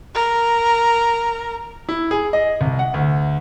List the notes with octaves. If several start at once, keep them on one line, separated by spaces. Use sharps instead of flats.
A#4
E4
G#4
D#5
C2
F#5
D2